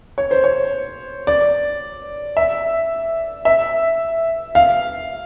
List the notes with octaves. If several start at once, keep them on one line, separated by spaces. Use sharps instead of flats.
C#5
C5
C#5
D5
E5
E5
F5